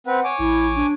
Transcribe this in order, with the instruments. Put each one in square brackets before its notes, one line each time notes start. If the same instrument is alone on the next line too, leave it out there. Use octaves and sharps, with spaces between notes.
[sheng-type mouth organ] C4 B4 [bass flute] F#5
[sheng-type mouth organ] C#5 G#5 D6
[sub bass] A1 [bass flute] E4
[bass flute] D4